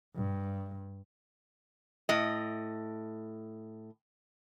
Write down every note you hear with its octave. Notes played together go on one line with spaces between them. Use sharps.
G2
A2 D#5